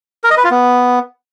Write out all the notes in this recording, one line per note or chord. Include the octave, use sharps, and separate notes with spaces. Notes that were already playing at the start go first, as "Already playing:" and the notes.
A#4
D#5
B4
F4
B3